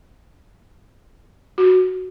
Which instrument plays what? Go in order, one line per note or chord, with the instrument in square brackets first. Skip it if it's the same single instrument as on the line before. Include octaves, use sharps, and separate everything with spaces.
[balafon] F#4